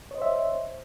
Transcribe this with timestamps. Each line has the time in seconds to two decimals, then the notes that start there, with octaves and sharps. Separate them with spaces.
0.11 C#5
0.15 D#5
0.18 C5
0.22 E5